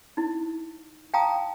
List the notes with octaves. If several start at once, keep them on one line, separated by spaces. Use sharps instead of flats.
D#4 E4
F5 G5 A5 A#5 D#6